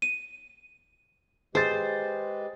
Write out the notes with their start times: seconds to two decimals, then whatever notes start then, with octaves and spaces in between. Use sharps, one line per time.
0.02 D#7
1.55 G#3 G4 G#4 B4 C5 A6